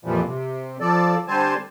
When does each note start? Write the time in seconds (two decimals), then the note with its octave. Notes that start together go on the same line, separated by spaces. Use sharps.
0.04 F2 A#2 E3 F3 G3
0.25 C3
0.80 F3 A4 D5
1.28 D3 G3 C4 C5 G#5 A5